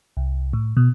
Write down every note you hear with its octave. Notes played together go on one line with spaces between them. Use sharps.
C2
A2
B2